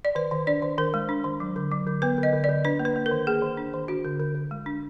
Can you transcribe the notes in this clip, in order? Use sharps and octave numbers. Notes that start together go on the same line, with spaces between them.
D5
D#3 B4
D#3
D4 D5
D#3
D#3 A#4
G#3
D4
D#3
F#3
D3
F#3
D3
B3 B4
D3 D#5
D3
D5
D3
D4 B4
A#3
B4
A#3
A#4
D#3
A#3 G#4
D#3
D4
D#3
D4 F#4
D3
D3
D3
G#3
D4